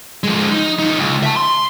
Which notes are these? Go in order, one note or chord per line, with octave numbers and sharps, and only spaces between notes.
F3 G#3
D#4
F3 D#4
C#2
E5 A5
C6